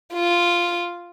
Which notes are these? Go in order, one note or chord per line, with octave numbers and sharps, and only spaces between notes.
F4